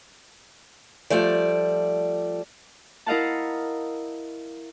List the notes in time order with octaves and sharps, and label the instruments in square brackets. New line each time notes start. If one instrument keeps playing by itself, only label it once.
[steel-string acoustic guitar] F3 G3 A3 D5
[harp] E4 A#4 D#5 F5 F#5 A5